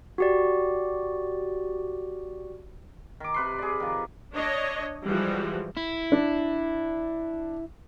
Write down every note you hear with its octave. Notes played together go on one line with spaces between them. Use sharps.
F#4 G4 D5
D#3 D6
C3 B4 C6
G#4 D5
D#3 F3
D4 C#5 D#5
E3 F3 G3 G#3 F#4
E4
D4